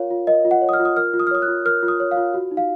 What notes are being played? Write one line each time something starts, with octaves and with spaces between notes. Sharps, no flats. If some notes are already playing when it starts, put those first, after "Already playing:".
Already playing: F4 A#4 C#5 F5
F4
A#4 D#5
F4
F#5
C#5
D#6
F6
F4
D#6
A#4 F6
F4
D#6
F6
C#5 D#6
F#6
F4
A#4 F6
F4
D#6
C#5
F5
F4
F#4
D#4
F5